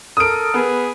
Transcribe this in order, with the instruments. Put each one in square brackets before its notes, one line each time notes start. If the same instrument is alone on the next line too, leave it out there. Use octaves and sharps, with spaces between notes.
[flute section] A4 A#4 F6 [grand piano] D#6 D7
[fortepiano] B3 [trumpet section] G#4 B4